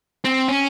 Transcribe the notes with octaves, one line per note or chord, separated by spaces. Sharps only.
C4
C#4